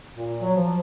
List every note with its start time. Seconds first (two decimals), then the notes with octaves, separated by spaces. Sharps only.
0.14 A#2
0.41 F#3
0.55 F3